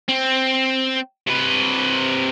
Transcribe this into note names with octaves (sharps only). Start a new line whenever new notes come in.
C4
C3 B4